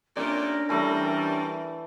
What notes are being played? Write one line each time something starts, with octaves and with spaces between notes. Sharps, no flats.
A#2 A3 C#4 D4 G4 A#4 D5
E3 G3 A3